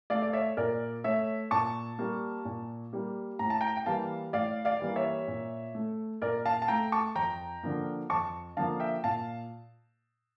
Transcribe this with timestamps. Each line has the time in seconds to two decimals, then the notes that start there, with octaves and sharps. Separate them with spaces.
0.10 A3 D5 F5
0.22 D5
0.33 C#5 E5
0.57 A#2 A#4 D5
1.04 A3 C#5 E5
1.51 A#2 A5 C#6
1.99 G3 A#3
2.45 A#2
2.93 G3 A#3
3.39 A2 A#5
3.50 A5
3.61 G5 A#5
3.77 G5
3.86 E3 G3 A#3 F5 A5
4.33 A2 D5 F5
4.65 D5 F5
4.80 E3 G3 A#3
4.96 C#5 E5
5.28 A#2
5.75 A3
6.22 A#2 A#4 D5
6.46 F5 A5
6.62 A5
6.68 A3 G5 A#5
6.92 A5 C#6
7.15 F2 G5 A#5
7.63 D3 F3 A#3
8.10 F2 A5 C#6
8.57 D3 F3 A#3 F5 A5
8.80 E5 G5
9.04 A#2 F5 A5